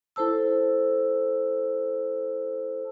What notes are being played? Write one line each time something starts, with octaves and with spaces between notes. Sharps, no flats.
E4 A4 C5 A5 E6